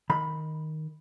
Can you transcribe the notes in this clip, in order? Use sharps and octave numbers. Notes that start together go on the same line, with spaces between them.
D#3 B5